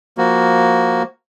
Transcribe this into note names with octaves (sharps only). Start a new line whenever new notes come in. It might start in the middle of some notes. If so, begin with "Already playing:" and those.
F3 A#3 F#4